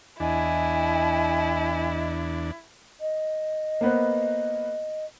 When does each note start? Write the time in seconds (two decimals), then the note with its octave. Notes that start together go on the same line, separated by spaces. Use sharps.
0.20 E2 D4 E4 D#5 G#5
3.01 D#5
3.81 A#3 B3 C5